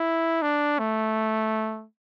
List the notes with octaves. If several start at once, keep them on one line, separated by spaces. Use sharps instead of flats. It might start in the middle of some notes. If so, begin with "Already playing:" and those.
Already playing: E4
D4
A3